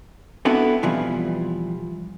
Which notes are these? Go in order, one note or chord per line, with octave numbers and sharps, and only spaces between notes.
B3 C4 D4 E4 F#4 A4
B2 E3 F3 G3